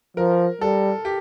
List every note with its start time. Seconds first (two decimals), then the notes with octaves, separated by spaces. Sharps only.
0.17 F3 A#4
0.61 G3 A4
1.05 G4